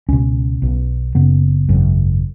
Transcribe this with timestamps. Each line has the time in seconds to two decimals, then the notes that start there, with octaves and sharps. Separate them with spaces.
0.08 C#2 B2 C#4
0.62 B1 B2
1.15 F#1 F#2 C#3 B3
1.68 G#1 F#2 C#3